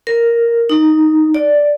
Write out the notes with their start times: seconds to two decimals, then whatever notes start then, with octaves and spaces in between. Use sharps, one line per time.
0.07 A#4
0.69 D#4
1.34 D5